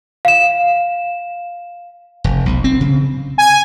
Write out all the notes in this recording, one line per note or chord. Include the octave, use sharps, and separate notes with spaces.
F5 E7
F1
B1
C4
C#3
G#5